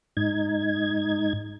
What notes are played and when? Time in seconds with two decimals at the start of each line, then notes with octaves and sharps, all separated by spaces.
0.17 G#2 D#4 G#6